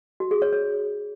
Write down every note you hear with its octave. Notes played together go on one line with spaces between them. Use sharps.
F#4
G#4
C#5
C#5